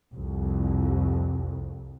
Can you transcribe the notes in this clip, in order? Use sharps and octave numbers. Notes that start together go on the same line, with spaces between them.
C2 F2